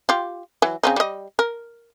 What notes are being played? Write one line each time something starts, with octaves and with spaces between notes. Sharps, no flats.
F4 G4
E3 F#3
C#3 C4 D#4
G3 D#5
A#4